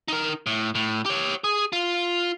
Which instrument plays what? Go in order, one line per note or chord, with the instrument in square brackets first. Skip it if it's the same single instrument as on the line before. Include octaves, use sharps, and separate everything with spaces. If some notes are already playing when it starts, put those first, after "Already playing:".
[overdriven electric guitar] D#4 A#4
A2
A2
G4 C#5
G#4
F4